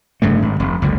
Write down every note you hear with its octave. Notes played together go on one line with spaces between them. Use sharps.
F1 G2 C#3 A3
G#1
F1
F#1 C#2 D3